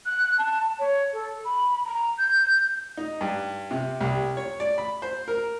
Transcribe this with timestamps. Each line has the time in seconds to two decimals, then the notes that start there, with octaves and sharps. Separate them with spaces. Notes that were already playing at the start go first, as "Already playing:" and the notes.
0.06 F#6
0.38 A5
0.79 C#5
1.13 A4
1.44 B5
1.85 A#5
2.18 G6
2.97 D#4
3.21 G2
3.71 C3
4.01 C2
4.37 C#5
4.60 D5
4.78 B5
5.02 C5
5.28 A#4